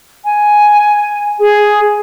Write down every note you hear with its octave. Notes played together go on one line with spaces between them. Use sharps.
G#5
G#4